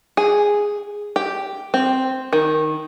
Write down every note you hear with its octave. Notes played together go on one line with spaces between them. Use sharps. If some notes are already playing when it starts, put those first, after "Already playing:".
G#4
G4
C4
D#3